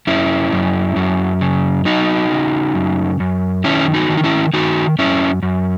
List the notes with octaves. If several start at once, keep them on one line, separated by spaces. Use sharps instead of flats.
F#2 C#4 E4
F#2
F#2
C#3
F#3 D#4 F#4
C#3
F#2
F#2
D#3 C#4 E4
D#4 F#4
D#3
D#4
C#4 E4
D#3 D#4 F#4
F#2 C#4 E4
F#2